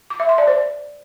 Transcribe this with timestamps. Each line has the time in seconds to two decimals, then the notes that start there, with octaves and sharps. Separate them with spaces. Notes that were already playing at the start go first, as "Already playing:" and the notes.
0.10 D6
0.20 E5
0.29 C6
0.38 D5
0.47 C5